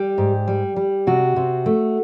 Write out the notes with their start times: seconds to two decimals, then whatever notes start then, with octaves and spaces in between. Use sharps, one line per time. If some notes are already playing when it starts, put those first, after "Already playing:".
Already playing: G3 G4
0.18 G#2
0.48 G3
0.76 G3
1.07 C3 F#4
1.36 C3
1.66 A3